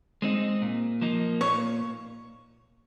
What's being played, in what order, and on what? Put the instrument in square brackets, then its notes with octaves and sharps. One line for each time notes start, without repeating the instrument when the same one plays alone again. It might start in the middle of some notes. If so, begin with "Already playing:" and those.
[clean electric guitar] G#3 C4 D#4
A#2
F3 A#3 D#4
[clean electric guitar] A#2 [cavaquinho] C#5